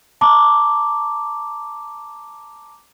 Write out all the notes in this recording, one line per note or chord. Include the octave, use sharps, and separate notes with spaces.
A5 A#5 D6